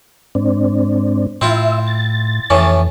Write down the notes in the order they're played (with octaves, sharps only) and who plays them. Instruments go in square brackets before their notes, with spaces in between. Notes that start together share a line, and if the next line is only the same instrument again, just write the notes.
[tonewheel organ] G#2 C4 D4
[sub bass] A2 [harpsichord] C4 E4 F4 [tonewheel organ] E5
[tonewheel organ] A6
[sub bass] F2 [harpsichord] A2 E3 C#4